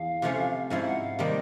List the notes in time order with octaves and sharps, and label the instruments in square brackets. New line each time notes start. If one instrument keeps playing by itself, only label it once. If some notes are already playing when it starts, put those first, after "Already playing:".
Already playing: [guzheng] E2 [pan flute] F5
[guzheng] C3 F3 A3 C#4
[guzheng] G#2 F3 G#3 C#4 E4 [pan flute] F5
[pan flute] F#5
F5
[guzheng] C3 D#3 G3 A#3 [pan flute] D#5